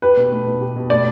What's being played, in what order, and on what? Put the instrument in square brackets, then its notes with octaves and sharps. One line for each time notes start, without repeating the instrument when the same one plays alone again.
[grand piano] G4 [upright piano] B4
[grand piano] B2
A3
B2
G4
B2
[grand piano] A3 [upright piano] D5